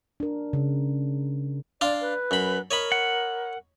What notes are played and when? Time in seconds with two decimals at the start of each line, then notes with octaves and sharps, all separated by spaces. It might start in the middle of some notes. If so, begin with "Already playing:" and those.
0.20 D4 A#4
0.53 C#3
1.81 D4 D5 F5 C6
2.01 B4
2.31 F#2 B5
2.71 A#4 C#5 D#5 B5
2.92 F#5